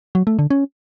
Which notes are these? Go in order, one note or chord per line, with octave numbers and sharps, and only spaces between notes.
F#3
A3
D3
C#4